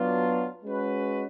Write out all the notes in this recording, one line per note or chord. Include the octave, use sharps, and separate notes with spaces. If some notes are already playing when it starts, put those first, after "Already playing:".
Already playing: F#3 B3 D4 F4
G#3 C#4 F#4 B4